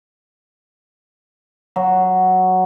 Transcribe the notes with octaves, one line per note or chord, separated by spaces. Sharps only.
F#3 F#4